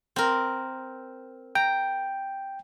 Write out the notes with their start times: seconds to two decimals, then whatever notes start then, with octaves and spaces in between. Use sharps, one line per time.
0.16 C4 A#4
1.55 G5 A#5